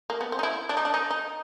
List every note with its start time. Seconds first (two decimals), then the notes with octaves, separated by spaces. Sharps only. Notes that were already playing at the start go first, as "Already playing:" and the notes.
0.10 A#3
0.21 B3
0.32 C4
0.39 D#4
0.43 E4
0.69 D4
0.77 D#4
0.85 D4
0.94 D#4
1.10 D#4